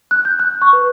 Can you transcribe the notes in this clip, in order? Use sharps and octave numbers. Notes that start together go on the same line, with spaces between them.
F#6
G6
F#6
C#6
B4